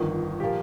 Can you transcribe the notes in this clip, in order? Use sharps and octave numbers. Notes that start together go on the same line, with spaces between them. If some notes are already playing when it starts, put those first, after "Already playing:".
Already playing: G1 F2 D#3
A#2 F3 A#3 G4